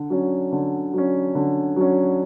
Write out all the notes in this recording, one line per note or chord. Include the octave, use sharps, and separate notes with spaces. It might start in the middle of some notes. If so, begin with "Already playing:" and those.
Already playing: D3
F#3 C#4
D3
F#3 C#4
D3
F#3 C#4